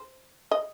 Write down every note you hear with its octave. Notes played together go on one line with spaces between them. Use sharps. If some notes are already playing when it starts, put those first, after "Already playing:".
Already playing: C5
D#5